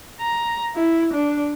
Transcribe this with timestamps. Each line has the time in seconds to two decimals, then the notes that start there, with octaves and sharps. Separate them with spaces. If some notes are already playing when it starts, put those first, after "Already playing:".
0.21 A#5
0.75 E4
1.14 D4